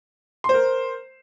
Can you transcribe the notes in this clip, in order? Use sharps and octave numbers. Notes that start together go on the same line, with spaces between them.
A#4 C5 C6